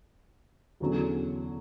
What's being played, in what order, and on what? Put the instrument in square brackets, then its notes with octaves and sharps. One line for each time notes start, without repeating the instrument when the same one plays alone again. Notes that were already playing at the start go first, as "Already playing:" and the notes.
[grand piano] E2 D3 F#3 C#4